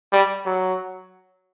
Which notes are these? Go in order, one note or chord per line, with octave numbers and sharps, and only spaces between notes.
G3
F#3